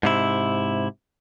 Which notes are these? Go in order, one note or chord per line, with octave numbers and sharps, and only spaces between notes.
G#2 C3 E4